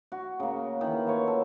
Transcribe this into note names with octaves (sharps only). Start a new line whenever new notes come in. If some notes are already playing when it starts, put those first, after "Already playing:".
F#4
C#3 A#3
D#3 E3
F4 B4 C#5
A4